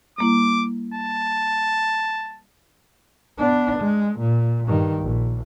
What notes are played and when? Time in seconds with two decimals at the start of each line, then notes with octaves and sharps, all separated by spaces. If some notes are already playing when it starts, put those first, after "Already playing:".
0.18 G3 A#3 E4 D6
0.94 A5
3.38 B3 D4
3.79 G#3
4.19 A#2
4.68 G2 D#3
5.02 A#1